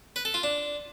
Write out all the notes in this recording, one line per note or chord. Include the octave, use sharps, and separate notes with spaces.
B4
A4
F4
D4